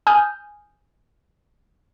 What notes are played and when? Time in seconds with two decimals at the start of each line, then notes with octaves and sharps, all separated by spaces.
0.07 G#5 D#6 F6 G6